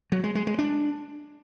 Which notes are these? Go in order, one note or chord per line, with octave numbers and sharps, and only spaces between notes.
F#3
G#3
G#3
G#3
D4